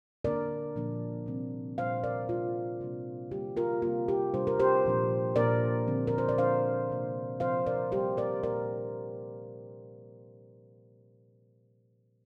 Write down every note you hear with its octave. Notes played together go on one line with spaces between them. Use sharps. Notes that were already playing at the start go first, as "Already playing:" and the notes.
D3 A#3 D4 A#4 D5
A#2 F3 A#3 D4
C3 G3 C4
A#2 G3 D4 C5 F5
A#4 D5
C3 G3 D4 F4
C3 G3 A#3 D4
D3 G3 A#3 G4
F4 A#4
C3 G3 A#3 F4
G4
C3 G3 D4 C5
A#4
G4 C5
A#2 F3 A#3 D4
A#2 A#3 D4 A#4 D5
D3 F3 C4
A#4
C5
D5
F3 D4 C5 F5
C3 A#3 D4
C3 F3 C4 C5 F5
A#4 D5
C3 G3 A#3 G4 C5
A#4 D5
A#2 A#3 D4 A#4 D5